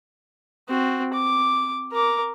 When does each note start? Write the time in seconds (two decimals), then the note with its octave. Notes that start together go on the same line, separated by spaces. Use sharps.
0.69 C4 F#4
1.14 D6
1.92 A#4 D6